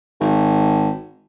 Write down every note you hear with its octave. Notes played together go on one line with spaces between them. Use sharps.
G#1